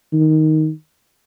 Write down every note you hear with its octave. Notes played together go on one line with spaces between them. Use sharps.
D#3